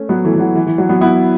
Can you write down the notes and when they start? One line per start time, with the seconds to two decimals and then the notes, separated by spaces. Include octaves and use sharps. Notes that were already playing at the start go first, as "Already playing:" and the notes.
Already playing: A3 C#4
0.09 F#3 B3
0.25 E3 A3
0.35 E3
0.40 F#3
0.55 E3
0.67 E3
0.78 F#3
0.89 F#3 B3
1.01 B3 E4